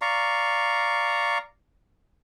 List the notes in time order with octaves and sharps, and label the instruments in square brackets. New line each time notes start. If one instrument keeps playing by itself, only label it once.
[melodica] D5 F5 A#5 C#6